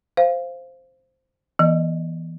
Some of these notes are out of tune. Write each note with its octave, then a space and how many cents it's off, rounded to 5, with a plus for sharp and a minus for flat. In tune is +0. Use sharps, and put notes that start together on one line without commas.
C5 +0 F5 -10
E3 +5 B3 -40 D#5 +0